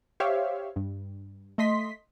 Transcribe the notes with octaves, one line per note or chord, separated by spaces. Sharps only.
G4 C5 C#5 E5 F5
G2
A3 D#5 C6 B6